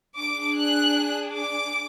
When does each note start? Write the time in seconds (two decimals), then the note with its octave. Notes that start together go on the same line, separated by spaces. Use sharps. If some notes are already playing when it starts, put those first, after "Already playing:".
0.17 D4 G#4 D6
0.57 F#6
1.36 D6